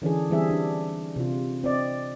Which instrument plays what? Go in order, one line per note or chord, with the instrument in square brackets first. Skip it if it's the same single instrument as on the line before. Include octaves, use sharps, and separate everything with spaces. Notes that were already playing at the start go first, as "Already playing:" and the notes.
[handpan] D3 E3 C#4 D4 G#4
E3 G3 C4 G#4 E5
D4
C3 F4
C4 D5 D#5